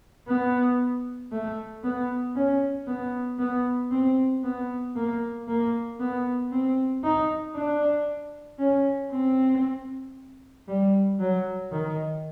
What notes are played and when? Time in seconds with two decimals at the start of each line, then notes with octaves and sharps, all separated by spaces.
0.28 B3
1.32 A3
1.84 B3
2.35 C#4
2.87 B3
3.39 B3
3.91 C4
4.44 B3
4.96 A#3
5.48 A#3
6.00 B3
6.52 C4
7.04 D#4
7.56 D4
8.59 C#4
9.11 C4
10.68 G3
11.19 F#3
11.72 D#3